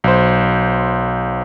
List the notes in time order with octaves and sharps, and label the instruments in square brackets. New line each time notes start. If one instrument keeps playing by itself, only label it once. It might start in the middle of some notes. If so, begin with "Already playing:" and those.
[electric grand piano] B1 C5